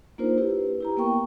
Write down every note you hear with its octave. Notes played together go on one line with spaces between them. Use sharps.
A#3 D4 D#4 F4 A#4 C5
E4 G4 B4
E4 G4 A#5
A#3 B3 A#4 G5 C#6